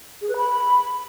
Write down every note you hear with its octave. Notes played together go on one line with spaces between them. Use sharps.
G#4
B4
B5